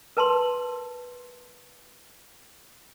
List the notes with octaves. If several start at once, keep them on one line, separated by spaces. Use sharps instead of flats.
A#4 B4 A5 B5 C6